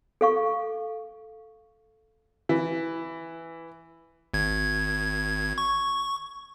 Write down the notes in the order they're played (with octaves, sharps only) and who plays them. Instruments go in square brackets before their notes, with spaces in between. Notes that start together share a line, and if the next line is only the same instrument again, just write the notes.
[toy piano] A4 F5 C#6
[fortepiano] E3
[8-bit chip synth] G#1 G#6
C#6